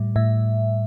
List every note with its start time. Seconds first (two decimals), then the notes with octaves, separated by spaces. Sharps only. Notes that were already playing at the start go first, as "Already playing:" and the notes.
Already playing: A2 G3
0.16 A2 E5